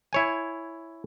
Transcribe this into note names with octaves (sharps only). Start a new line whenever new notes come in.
E4 C#5 G#5